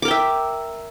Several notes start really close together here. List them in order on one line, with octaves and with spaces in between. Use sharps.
D6 A#4 G5 E5